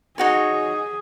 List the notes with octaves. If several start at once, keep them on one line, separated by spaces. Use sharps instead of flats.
D#4 F#4 G#4 C#5